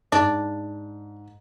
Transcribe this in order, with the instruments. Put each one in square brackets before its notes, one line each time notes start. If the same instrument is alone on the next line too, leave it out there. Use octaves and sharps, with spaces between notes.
[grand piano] G#2 [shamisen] D4